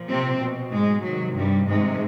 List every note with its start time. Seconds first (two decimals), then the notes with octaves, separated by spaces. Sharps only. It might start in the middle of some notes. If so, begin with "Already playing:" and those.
Already playing: A#2 F3
0.09 C3 C4
0.41 B2
0.73 G#2 G#3
1.04 C3 D#3 F#3
1.36 G2 G3
1.68 G#2 C3 D#3 G#3